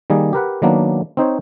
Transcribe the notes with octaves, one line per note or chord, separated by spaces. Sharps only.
D#3 G3 A#3 G#4
G4 A#4 B4 F#5
D#3 F#3 A#3 B3 D4
C4 D#4 C5 C#5